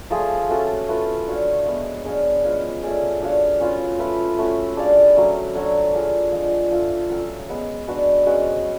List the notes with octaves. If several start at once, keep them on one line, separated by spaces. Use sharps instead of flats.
F3 A3 F4 G#4
A3 C#4 F#4 A4
A3 F4 B4
D4 F#4 C#5 F5
G#3 B3 F#4
D4 G#4 C#5 F5
G#3 C#4 F4 B4
A3 C#4 G#4 D5
D4 F#4 C#5 F5
C#4 F4 B4
A3 F4 B4
A3 C#4 F#4
D4 G#4 D5 F5
F#3 A3 C#4
A3 D4 F#4 C#5
D4 F4 G#4
F3 G#3 D4
F3 A3 F4
F#3 C#4 F#4 A4
G#3 B3 F#4
G#3 D4 F#4 B4
G#3 C#4 F#4 B4